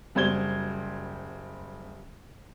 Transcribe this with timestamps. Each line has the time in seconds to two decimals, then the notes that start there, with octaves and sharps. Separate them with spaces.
0.15 F#1 G3 C5 G#6 G7